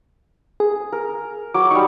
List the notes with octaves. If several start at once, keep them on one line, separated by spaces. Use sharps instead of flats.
G#4
A#4
F#3 D6
G3 D#4 C#6